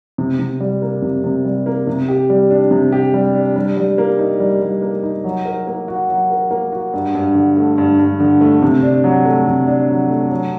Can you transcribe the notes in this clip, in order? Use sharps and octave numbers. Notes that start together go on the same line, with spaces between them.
C3
C3
G3
A#3
C3
C3
G3
A#3
C3
G4
G3
D4
C3
G4
G3
D4
G3
G3
A#3
D#4
G3
G3
A#3
D#4
F#3
A#4
A#3
F#4
F#3
A#4
A#3
F#4
G2
G2
D3
A3
G2
G2
D3
A3
C3
D4
F#3
A3
C3
D4
F#3
A3
F#3